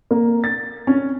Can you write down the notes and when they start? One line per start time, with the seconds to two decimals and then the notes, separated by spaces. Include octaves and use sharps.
0.11 A#3
0.44 A6
0.87 C#4